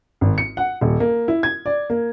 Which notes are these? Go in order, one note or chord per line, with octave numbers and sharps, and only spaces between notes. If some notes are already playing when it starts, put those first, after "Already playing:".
G#1
C#7
F#5
D#1
A#3
E4
G#6
D5
A#3